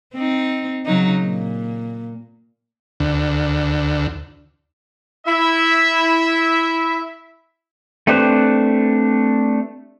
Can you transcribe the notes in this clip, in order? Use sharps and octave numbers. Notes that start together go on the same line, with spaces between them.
C4 D#4
C#3 F#3 D#4
A#2
D2
E4 E5
A3 C4 D4 G4 B4 C5